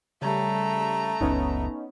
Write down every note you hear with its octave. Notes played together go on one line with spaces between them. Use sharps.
C#3 G3 A3 A#5
F#1 C#2 B3 C#4 D#4